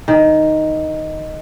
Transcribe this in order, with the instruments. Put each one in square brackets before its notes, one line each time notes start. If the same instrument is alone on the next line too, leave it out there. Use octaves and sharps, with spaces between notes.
[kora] D#3